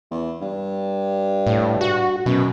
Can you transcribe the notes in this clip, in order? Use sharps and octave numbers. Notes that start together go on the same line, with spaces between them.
E2
G2
A2
F#4
F#2 B2